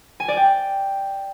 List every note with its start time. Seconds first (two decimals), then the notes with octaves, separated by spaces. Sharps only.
0.20 G#5
0.28 D5
0.37 G5